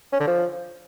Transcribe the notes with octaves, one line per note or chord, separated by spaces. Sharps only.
C#4
D3
F3